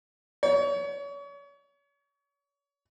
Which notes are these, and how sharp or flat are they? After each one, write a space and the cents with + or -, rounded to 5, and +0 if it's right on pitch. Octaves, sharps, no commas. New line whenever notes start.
C#5 +35